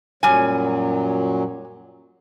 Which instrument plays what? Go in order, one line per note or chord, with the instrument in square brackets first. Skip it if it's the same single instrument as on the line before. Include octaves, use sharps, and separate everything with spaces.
[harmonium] F#2 A#2 F#3 [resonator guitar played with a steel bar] G3 G#5